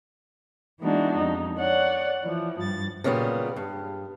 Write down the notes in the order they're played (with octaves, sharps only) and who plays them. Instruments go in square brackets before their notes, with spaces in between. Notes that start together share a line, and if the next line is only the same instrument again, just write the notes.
[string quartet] E3 G#3 B3 D4 D#4 F#4
F2 D#4
C#5 D5 F#5
E3 F3
G2 A6
[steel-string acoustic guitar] A#2 C#3 F#3 G3 B3
G2